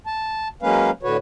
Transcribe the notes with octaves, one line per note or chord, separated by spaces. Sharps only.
A5
F#3 G#3 A#3 C#4 B4 F5
A2 D3 F#4 B4 C#5